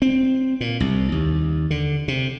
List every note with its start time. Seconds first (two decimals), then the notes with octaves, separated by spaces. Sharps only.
0.02 C4
0.61 A#2
0.80 C2
1.12 D#2
1.71 D3
2.08 C3